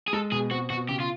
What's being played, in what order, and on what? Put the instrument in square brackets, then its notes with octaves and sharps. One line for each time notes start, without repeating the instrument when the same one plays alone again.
[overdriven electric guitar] G#4
[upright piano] G#3 [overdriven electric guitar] A4
[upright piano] B2 [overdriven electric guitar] G#4
[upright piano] C4 [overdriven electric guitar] F#4
[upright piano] B2 [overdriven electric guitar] F#4
[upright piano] C#3 [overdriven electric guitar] G4
[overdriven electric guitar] F4